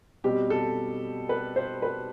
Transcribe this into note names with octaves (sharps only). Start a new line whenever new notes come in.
B2 G3 C4 G4
A4
B4
C5
B4